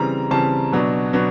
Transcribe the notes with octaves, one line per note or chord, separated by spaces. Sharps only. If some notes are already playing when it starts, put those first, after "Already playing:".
Already playing: C#3 E3 G3 C4 A#5
C#3 E3 G3 C4 A5
B2 F#3 B3 D4
B2 F#3 B3 D4